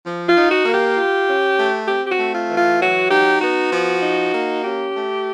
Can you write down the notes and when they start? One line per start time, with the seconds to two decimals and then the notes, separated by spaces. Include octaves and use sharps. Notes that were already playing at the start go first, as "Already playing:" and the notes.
0.04 F3
0.28 F4
0.36 D#4
0.51 F#4
0.65 A#3
0.74 G4
0.97 F4
1.27 C#4
1.58 A3
1.88 C4 G4
2.07 G4
2.12 F#4
2.19 A3
2.34 F4
2.49 E3
2.57 F4
2.80 F#3 F#4
3.10 D#4 G4
3.41 B3 F#4
3.72 F3
4.02 D#4
4.33 A#3
4.63 C#4 G4
4.94 A3